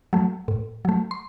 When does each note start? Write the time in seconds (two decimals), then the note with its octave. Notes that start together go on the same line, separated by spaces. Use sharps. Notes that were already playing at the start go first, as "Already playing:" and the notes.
0.13 F#3 A3
0.48 A2
0.85 F#3 A3
1.11 C6